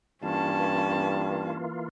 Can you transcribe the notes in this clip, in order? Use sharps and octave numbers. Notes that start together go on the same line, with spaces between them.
G2 E3 A#3 C#4 F4 A5